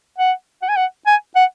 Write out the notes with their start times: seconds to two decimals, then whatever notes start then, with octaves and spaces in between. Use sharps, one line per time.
0.19 F#5
0.62 F#5
0.69 G#5
0.76 F#5
1.06 G#5
1.35 F#5